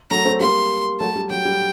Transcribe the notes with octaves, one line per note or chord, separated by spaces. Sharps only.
F#3 A3 A#5
A3 C4
G3 A#3 C6
F#3 A3 A5
G3
F#3 G5
G3